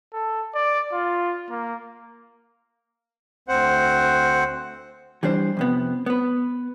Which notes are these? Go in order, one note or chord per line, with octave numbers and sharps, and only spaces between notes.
A4
D5
F4
A#3
D2 C4 C5 F#5
E3 G3 D4 C5
F2 C3 B3
B3 B4